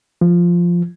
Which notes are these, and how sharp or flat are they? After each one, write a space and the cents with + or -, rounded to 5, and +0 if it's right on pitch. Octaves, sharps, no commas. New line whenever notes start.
F3 -5